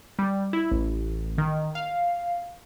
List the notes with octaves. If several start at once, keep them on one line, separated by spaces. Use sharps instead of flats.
G3
E4
A1
D#3
F5